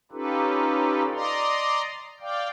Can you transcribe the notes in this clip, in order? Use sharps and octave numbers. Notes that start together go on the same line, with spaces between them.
C#4 D#4 F4 G4 A4 B4
D5 D#5 A#5 C6
D5 F5 G5